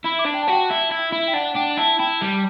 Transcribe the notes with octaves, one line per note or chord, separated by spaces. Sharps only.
E4 B5
D6
D4
G5
A5
F#4 G5
E4
E4
E4
G5
D4 F#5
D4 G5
E4 A5
E4 G5
G3